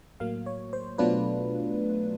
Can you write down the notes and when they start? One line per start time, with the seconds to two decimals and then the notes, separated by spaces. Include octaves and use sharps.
0.20 A2 F#3 A#3 F5
0.46 C#5
0.73 C5
0.98 B2 F#3 A3 D4 F4 B4